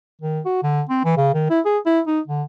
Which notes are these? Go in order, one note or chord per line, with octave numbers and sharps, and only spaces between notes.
D#3
F#4
D3
C4
E3
C#3
D#3
E4
G#4
E4
D#4
D3